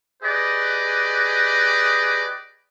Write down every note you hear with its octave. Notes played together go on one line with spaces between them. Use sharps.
G4 G#4 B4 D5 D#5